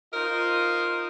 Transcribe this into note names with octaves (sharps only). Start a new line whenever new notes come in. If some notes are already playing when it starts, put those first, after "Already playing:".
D#4 F4 A#4 C5 D#5